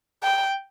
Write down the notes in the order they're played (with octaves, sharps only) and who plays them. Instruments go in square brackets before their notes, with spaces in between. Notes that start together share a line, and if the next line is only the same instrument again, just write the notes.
[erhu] G5